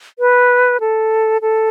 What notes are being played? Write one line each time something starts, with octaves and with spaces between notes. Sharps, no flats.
B4
A4
A4